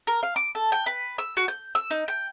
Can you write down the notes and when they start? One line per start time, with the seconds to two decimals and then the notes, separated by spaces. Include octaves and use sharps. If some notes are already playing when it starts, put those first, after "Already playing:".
0.07 A#4
0.23 F5
0.36 D6
0.55 A4
0.72 G5
0.86 B4
1.18 E6
1.37 F#4
1.48 G6
1.75 E6
1.91 D#4
2.08 G5